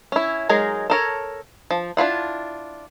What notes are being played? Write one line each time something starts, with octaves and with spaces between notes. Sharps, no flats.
C#4 E4
F#3 G#3 D#4 G#4 A#4
A4 A#4 C#5
F3
D4 E4 F4 F#5